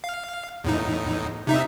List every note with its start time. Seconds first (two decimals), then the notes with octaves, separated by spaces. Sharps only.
0.04 F5
0.64 E2 A2 D#4
1.47 C3 D#4 E5